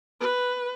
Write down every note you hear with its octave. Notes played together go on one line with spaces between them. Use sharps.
B4